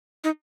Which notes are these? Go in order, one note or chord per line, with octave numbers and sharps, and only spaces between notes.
D#4